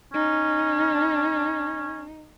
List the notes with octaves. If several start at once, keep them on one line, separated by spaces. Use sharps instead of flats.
C#4 D#4